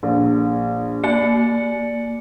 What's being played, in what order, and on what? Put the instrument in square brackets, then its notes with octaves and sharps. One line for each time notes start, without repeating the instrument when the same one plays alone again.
[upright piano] A#1
[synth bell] A#3 C#7 [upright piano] D5